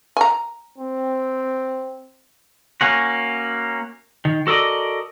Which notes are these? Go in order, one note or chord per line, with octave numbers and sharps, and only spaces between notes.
G#5 A#5
C4
A#3 C#4 F#4
D#3
F#4 A4 A#4 D5 D#5